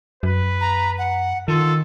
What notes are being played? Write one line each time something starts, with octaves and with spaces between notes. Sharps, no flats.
F#2 B4
A#5
F#5
D#3 F4 A4